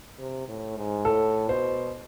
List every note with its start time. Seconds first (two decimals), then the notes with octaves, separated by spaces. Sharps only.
0.18 C3
0.48 A2
0.77 G#2
1.05 A2 A4
1.49 B2 C5